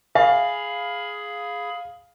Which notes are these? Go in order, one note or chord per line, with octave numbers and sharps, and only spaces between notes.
G#4 E5 F5 G#5 B5